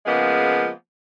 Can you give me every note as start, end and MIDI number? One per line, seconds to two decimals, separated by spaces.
0.06 0.68 49
0.06 0.68 53
0.06 0.68 56
0.06 0.68 58
0.06 0.68 59